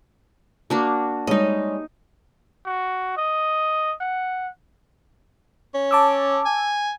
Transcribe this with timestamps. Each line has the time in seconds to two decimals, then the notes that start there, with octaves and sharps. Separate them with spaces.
0.70 A#3 D4 F#4
1.27 G3 G#3 D#4 C#5 D#5
2.66 F#4
3.17 D#5
4.01 F#5
5.74 C#4
5.91 A5 D6 E6
6.45 G#5